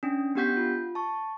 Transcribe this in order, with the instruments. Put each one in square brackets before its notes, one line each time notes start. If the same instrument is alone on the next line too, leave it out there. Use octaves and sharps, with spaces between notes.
[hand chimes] C#4 D4
B3 D4 G4 F#5 G6 B6
F4
A5 C#6